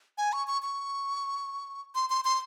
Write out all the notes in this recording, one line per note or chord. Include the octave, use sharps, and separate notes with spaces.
G#5
C#6
C#6
C#6
C6
C6
C6